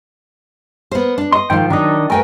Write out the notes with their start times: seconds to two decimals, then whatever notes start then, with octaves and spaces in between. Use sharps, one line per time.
0.91 B3 A#4 C5
1.18 D4
1.32 D#5 C6
1.50 G#2 D#3 F3 G5
1.70 D#3 F#3 D4 D#4 D#5
2.10 A3 A#4 B4 G5 G#5